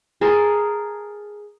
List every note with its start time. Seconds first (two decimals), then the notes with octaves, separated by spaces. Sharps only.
0.21 G#4 A#4 A5 C6